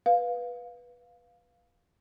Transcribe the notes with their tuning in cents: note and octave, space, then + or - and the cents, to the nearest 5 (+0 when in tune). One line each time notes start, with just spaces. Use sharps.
B4 -10 F5 +10